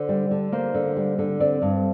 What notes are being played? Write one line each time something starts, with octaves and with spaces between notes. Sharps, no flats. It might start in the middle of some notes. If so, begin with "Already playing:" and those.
Already playing: D3 C5
G3
D3
A#3 C5
D3
G3
D3
C4 D5
G2